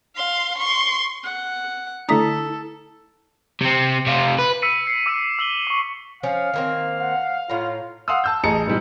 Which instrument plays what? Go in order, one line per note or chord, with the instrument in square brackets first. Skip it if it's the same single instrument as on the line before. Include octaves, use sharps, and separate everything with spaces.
[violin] F5 C6
C6 C#6
[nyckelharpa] F#5
[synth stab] D3 A3 D4 [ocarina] E4 [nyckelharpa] A4 [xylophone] A#5 D#6 B6
[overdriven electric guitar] C3 C4
C3 F4
B4
[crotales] E6 B6 C#7 D#7
C7 C#7
D6 E6 B6 D#7
E6 F#7 G7
C#6 D6
[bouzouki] F3 C#4 [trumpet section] F5
[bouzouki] D#3 A#3 C4
[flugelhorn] F#5
[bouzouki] A2 A#5 [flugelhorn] F4
[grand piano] F5 F#5 C6 D#6 E6
A5 E6 G6
A1 G#4 D#5 A5 A#5 C#7
G#2 B2 E3 G3 G#3